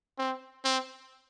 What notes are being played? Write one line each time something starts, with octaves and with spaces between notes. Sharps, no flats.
C4
C4